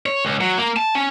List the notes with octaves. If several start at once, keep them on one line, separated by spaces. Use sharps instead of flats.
C#5
C#2
F#3
A#3
A5
C#4